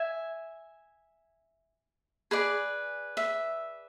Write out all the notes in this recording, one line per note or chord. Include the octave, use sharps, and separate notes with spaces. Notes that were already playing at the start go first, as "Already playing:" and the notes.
Already playing: E5 G#5
G#4 B4 D5
E5